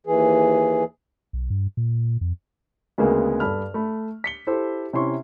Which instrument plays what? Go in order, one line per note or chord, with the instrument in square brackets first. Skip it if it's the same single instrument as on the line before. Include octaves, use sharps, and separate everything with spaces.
[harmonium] D#2 E3 G#4
[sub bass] B1
G2
A#2
F2
[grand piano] D2 C#3 G#3 A#3 B3
G2 A4 A5 B5 F6
A3 B5
B6 C#7 G7
E4 G4 A4 C5
C3 C#4 E4 C6 C#6